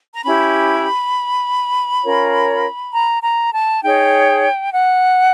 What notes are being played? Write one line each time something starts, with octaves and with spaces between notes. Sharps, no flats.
A#5
C#4 E4 G4 B5
C#4 F4 A#4 C#5
A#5
A#5
A5
D#4 G#4 C#5 G5
F#5